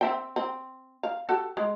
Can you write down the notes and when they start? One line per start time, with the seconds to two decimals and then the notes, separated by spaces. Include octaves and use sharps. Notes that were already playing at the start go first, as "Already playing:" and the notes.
0.01 C4 E5 G5
0.36 C4
1.03 F5
1.29 F#4 G4 A4
1.57 G#3